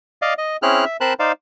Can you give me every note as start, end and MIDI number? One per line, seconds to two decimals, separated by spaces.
0.22 0.34 74
0.22 0.34 75
0.22 0.34 77
0.38 0.57 75
0.62 0.85 60
0.62 0.85 61
0.62 0.85 64
0.62 0.85 68
0.62 0.85 89
0.62 0.85 90
0.85 0.97 76
1.01 1.14 60
1.01 1.14 70
1.01 1.14 72
1.01 1.14 81
1.01 1.14 83
1.01 1.14 90
1.19 1.32 63
1.19 1.32 72
1.19 1.32 74
1.19 1.32 77